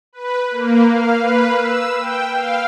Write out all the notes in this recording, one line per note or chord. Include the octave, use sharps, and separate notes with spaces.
B4
A#3
F5
B4
E6
G5
F5